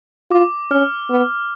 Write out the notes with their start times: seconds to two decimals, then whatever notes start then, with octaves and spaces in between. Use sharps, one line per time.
0.31 F4 D6
0.71 C#4 F6
1.10 B3